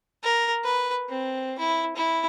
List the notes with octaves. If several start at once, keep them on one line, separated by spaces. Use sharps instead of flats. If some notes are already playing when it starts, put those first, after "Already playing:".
A#4
B4
C4
E4
E4